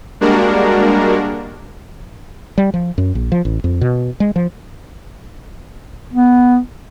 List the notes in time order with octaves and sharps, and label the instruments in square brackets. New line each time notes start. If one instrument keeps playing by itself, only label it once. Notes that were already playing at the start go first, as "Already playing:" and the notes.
[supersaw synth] G3 G#3 A#3 D4 F#4 A#4
[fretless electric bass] G3
F3
F#2
A#1
F3
A1
F2
B2
G#3
F3
[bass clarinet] B3